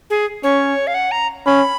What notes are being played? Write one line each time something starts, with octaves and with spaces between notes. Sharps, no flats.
G#4
C#4 C#5
F5
F#5
A#5
C#4 B5